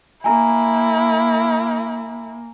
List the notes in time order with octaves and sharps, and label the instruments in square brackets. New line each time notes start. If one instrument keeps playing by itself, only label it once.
[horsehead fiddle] A#3 [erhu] E4 [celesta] G#5 A#5